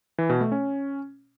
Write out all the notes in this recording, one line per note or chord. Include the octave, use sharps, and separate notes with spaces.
E3
B2
A3
C#4